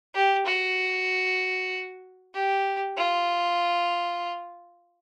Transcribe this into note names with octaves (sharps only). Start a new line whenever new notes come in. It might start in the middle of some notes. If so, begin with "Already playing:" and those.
G4
F#4
G4
F4